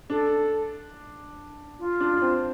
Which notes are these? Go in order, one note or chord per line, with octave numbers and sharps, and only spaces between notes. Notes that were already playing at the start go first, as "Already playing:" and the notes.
D4 A4
F4
D4
D4
C4